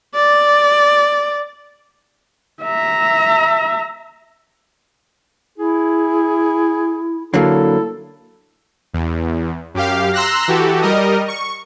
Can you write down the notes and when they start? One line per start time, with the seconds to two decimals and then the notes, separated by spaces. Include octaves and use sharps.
0.15 D5
2.63 E5 A#5
5.58 E4 G#4
7.34 D3 F#3 A#3 E4 A4
8.94 E2
9.74 F#2 G4 F5
10.14 A#5 C6 E6 F#6 A#6
10.48 E3 F#4 G4 A4
10.82 G3 A#4 D#5
11.28 C#6